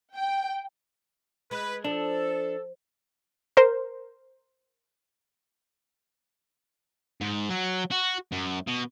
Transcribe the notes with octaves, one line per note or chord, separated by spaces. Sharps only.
G5
G#3 B4
F3 D4 A4
A#4 C5
G#2
F#3
F#4
F#2
B2